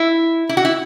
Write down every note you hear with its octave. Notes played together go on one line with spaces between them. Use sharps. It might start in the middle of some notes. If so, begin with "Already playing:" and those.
Already playing: E4
E4
F#4
E4